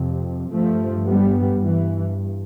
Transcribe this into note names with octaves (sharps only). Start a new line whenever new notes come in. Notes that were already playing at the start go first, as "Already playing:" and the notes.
Already playing: F2 C3
G2 F3 A3
G3 B3
G2 E3